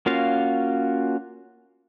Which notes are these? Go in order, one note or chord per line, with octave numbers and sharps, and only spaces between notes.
A#3 C#4 F4 F#4 F5